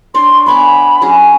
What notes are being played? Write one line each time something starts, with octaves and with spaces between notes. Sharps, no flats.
D4 C#5 D5 C6
B3 G#5 B5 D6
F#3 C#4 G#4